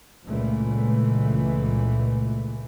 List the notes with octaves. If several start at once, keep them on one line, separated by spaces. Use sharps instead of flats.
C#2 A#2 E3 A3